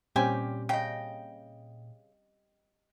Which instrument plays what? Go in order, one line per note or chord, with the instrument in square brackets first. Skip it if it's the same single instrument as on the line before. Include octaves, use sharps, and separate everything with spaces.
[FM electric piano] A#2 [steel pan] G3 C4 C#4 [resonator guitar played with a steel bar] G4 [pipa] C5 G5 G#5
[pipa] C#3 [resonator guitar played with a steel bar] D#5 G5